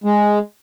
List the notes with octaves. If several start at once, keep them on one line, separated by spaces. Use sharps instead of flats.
G#3